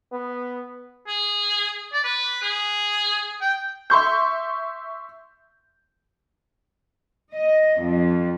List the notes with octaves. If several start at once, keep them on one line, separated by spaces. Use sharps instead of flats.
B3
G#4
D5
B4
G#4
G5
E5 C6 C#6 G6
D#5
F2